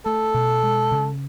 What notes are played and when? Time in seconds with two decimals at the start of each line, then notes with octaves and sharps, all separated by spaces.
0.05 A3 A4
0.34 B2
0.63 G#3
0.91 C#3